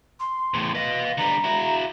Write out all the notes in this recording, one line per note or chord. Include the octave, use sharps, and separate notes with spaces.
C6
E2 A2
B4 D#5 F5
D3 G3 A#5
E4 F#4